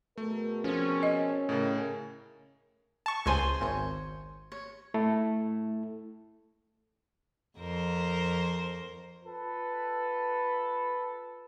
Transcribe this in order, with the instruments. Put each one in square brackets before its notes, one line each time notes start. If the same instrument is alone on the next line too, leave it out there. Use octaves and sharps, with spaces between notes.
[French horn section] B2 G#4 A#4 [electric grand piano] A3
[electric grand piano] F3 C4 [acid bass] C#4
[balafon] D#5
[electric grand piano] A2 C#3 [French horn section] A#4
[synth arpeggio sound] A5 C#6
[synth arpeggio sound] C#2 G#5 [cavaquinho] G#4 C5 C#5
[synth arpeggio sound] G#1 [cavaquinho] C5 C#5
[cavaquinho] C#5
[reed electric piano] A3 E4 A4
[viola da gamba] F2 A#4 C5
[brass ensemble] F4 A4 B4